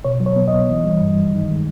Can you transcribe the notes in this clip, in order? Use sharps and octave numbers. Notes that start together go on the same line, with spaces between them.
B2 C#5
F#3
C#5
B3
D#5
C2
E3
G3
G2
G2
D#3
G#3